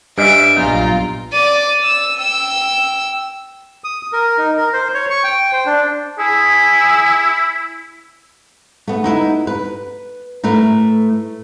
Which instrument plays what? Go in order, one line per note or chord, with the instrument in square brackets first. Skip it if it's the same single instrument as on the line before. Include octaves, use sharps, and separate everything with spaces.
[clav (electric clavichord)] G2 [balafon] D#5 G#5 [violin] E5 D7
[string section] A#1 F4 [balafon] F#3 B3 G#5 [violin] A#5
[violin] D5 D#7
E6
G5 E6
[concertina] D#6
A#4
D#4
A#4
C5
C#5
C#6
G5
C5
D4
[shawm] E4 [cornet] G#4
[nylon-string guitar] A3 B3
D#4 E4 B4
B4
A2 A3 A#4 B4